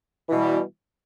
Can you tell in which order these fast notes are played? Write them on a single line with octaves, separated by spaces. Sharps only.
E3 B2 G3